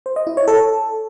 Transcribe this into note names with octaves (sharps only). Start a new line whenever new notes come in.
C5
D#5
E4
C#5
A4